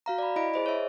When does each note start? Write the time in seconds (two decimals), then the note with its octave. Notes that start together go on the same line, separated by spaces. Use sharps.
0.06 F#4 F5 A#5
0.18 D5 B5
0.36 E4 D#5 B5 D7
0.54 G#4 C5 D#5
0.66 C#5 E5